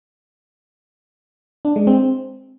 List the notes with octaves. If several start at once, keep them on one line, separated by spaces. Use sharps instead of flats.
D4
G#3
C4